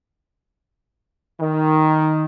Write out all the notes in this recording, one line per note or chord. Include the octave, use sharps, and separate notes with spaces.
D#3